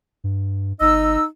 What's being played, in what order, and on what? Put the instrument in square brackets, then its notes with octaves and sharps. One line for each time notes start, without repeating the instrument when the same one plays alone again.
[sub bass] G2
[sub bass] G1 [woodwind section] D#4 D#5 E6